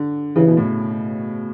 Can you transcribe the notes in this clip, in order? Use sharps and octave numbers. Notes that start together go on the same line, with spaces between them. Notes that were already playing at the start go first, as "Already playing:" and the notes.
Already playing: D3
C#3 E3
B2
A2